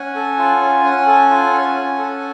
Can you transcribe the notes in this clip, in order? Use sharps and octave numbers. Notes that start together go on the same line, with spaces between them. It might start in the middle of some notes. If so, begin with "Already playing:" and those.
Already playing: C#4 F#5 G#5
A4
F4
C#4
C#4
A4
F4
C#4
C#4
A4